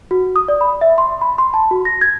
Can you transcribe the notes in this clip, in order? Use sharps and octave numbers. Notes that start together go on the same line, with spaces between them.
F#4
D#6
D5
B5
E5
C6
B5
C6
A5
F#4
A#6
G#6